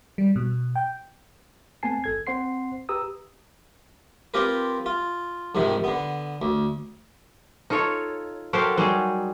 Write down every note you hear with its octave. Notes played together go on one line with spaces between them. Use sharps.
G3
B2
G5
A3 B3 C4 G#5 A5 C7
G1 A4 G#6
C4 C5 F#5 C6 C7
G4 B4 A#5 D#6 E6
C4 F4 G4 A#4 B4
F4
F2 G#2 C3 D#3
D3 B3
D2
D#4 F4 A4 C#5
F#3 G4 A4 A#4 C5 F5
F#3 G3 D#4 G#4